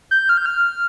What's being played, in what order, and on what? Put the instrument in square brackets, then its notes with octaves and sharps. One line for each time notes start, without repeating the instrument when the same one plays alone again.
[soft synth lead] G6
F6
G6
F6